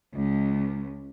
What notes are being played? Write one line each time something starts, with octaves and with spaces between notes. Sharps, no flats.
C#2